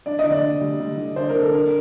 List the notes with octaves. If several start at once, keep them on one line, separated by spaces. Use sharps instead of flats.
D4 D5
D#5
D3
D5
D4
G3
G3
D3
D4 C5
A#4
D3
A4
D4 A#4